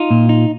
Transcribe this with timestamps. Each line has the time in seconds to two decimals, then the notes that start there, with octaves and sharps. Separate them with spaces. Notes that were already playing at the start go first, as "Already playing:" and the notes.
Already playing: D#4 F4
0.11 A#2
0.29 D#4